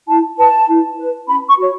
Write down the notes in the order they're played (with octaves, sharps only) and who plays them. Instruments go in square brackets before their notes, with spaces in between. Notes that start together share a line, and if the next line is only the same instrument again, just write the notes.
[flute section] E4 A5
B4 A5
E4
B4
C#4 B5
C#6
F#4 C#5